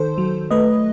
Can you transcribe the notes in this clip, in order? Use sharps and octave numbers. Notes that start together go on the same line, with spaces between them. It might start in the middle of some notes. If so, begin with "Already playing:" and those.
Already playing: D#3 A4 C5
F#3
A3 B4 D#5